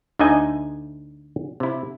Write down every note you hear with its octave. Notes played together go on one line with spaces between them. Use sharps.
D2 D3 A3 D#4 D#5 G#5
C3 E4